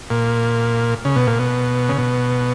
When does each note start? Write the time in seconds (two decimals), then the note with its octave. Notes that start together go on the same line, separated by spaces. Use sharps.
0.10 A#2
1.05 C#3
1.16 B2
1.27 A#2
1.39 B2
1.89 C#3
1.98 B2